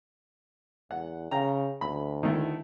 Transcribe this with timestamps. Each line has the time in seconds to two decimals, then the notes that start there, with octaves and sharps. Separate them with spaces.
0.91 E2 F#5
1.31 C#3 F5 G5 A#5
1.81 D2 B5
2.23 D#3 A3 E4